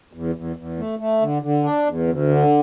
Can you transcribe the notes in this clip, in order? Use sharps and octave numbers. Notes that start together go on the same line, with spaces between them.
E2
E2
E2
A3
A3
D3
D3
D4
E2
D2
D3